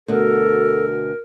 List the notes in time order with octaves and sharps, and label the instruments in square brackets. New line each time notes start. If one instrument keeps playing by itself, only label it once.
[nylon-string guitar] D2 B2 [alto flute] A4 [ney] A#4